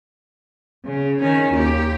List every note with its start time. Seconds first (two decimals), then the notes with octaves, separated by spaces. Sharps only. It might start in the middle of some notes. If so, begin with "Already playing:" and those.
0.85 C#3
1.19 D#3 C#4
1.53 D#2 G4